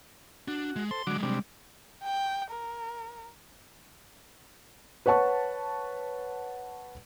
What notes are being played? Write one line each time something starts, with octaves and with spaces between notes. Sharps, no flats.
D4 F#4
G#3
A4 C5 C6
D3 F#3 G#3 F#4 D6
C3 G3 D4
G5
A#4
B4 C#5 F#5 A5 C#6